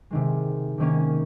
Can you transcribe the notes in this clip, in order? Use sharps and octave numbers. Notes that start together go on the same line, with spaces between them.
C3 D#3 G#3
C3 D#3 A#3 C#4